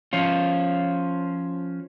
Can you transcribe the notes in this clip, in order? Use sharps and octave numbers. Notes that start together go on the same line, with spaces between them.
F3 C#4 F4